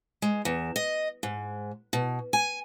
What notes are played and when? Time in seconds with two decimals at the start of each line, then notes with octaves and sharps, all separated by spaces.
0.22 G#3
0.45 E2
0.76 D#5
1.23 G#2
1.93 B2
2.33 G#5